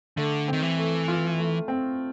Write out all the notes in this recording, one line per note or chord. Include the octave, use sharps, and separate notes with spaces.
D3 A3
D#3 C4
E3
A3
F4
A3
C4